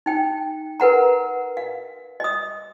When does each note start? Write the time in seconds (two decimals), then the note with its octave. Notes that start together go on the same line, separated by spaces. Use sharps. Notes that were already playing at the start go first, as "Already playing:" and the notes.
0.06 D#4 G5
0.80 A#4 B4 F#5 A#5
1.57 F5
2.20 D#5 D#6